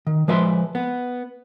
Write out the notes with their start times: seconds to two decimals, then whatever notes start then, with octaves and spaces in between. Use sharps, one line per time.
0.07 D#3
0.28 F3 G#3 B4 E5 C6
0.75 B3